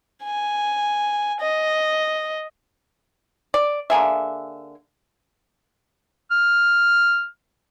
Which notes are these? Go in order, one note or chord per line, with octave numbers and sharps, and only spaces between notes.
G#5
D#5
D5
D3 A#3 G#4 E5
F6